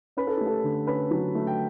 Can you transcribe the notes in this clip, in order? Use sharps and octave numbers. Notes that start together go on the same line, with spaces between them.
C#4 B4
A4
A3 G4
A4
D3
C#4 B4
F#3
A3
G5